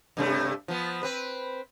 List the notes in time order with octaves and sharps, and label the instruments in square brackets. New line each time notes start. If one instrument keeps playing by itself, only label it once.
[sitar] G2 C3 A3
F3 B3
C4 B4